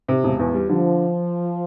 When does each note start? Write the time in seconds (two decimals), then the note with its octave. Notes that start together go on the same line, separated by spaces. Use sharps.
0.08 C3
0.24 E1
0.39 E2
0.54 G3
0.69 D3 F3